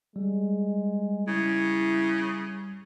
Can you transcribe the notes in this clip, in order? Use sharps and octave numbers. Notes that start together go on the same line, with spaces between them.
G3 G#3
C#3 E4